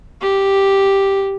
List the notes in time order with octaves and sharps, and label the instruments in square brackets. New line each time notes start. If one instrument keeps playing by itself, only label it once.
[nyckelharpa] G4